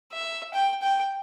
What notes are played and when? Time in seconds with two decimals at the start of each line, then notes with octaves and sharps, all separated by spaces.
0.13 E5
0.54 G5
0.82 G5